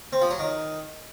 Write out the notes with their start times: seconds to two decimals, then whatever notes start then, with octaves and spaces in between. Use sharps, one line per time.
0.13 C4
0.22 F3
0.31 F#3
0.39 D#3